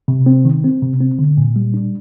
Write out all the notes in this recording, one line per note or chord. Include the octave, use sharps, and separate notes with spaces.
C3
C4
D#3
C4
C3
C4
D3
A#2
G3
D4